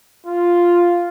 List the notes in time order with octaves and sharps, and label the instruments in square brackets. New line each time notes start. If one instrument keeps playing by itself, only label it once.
[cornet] F4